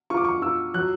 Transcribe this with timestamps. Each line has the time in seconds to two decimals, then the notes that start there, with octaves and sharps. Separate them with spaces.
0.10 F4 C#6
0.17 D6
0.25 C#6
0.42 F4 E6
0.74 F#3 F#6